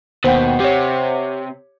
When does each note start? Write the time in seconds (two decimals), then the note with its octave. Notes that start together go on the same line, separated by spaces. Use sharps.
0.24 D#2 B2 C5 F#5 G5
0.60 C3 G4 C#5